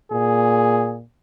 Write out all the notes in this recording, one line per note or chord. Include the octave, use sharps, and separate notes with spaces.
A#2 G#4